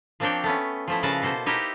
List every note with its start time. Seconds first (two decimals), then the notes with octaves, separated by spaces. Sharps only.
0.20 F3 A#3 C4 D4 C#5 G5
0.44 A3 B3 C#4
0.88 F3 A3 E4
1.03 C#3 A#4 B4 A5
1.22 B2 A#3 A4 C5
1.46 D#4 E4 G4 A#4